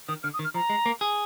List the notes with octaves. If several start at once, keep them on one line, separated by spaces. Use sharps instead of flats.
D#3 D#6
D3 F6
D#6
D#3
F6
F3 A#5
G#3
A#3
G#4